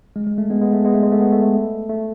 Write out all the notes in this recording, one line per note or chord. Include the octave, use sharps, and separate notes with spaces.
G#3
G#3
A3
G#3 B3
G#3 B3
A3
G#3 B3
A3
G#3
A3
G#3 B3
A3
A3
A3